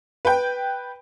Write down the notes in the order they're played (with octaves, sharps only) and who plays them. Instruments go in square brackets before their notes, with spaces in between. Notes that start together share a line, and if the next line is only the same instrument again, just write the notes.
[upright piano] B4 G5